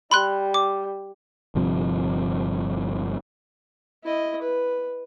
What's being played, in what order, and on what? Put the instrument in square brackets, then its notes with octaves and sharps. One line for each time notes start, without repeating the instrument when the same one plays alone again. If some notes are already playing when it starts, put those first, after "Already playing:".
[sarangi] G3 [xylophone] B5 C6 F#6
[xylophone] D6
[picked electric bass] G1 G2 C3 F3
[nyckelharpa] E4 D#5
B4